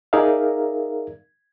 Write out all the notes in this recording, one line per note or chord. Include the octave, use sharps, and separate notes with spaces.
D#4 G#4 A#4 D5 E5 F5